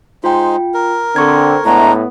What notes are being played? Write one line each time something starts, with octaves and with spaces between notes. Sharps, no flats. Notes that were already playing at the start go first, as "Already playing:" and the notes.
G#3 D#4 F4 C5 G5
A#4
D3 C4 A4 C#6 G#6
A2 G#3 A3 B3 D4 A#5